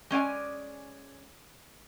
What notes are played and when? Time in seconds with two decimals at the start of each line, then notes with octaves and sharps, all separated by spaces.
0.11 G#3 C#4 D5 G#5